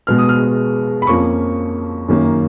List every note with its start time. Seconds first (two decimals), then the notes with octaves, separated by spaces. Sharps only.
0.07 B2 G#3 B3 F6
0.18 D#6
0.29 F6
1.02 B5
1.07 F2 F3 A#3 C#4 C#6
2.08 F#2 D#3 A#3 C#4